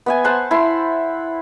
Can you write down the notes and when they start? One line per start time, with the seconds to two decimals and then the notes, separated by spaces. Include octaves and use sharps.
0.06 B3 E5 G#5
0.24 C5 F#5 A5
0.51 E4 A5 C6